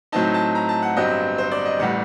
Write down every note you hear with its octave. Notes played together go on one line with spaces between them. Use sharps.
A2 F#3 C4 D#4 A5
A5
A#5
A5
F#5
G1 G2 F#3 C4 D#5
C5
D5
D#5
A1 A2 G3 F#5